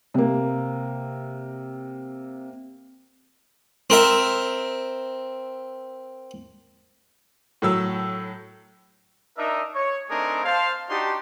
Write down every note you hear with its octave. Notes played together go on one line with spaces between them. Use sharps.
C3 A#3
C4 A#4 E5
A2 F#3 E6
D4 D#4 A#4 D#5 E5
C#5 C#6
A3 C4 D4 D#4 G#4 A#4
C5 F5 A5
D4 D#4 F#4 G4 A5 C6